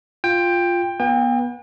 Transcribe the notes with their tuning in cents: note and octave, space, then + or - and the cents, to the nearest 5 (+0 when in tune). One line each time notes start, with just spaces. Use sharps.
F4 +0 G5 +15
B3 -25 G5 +40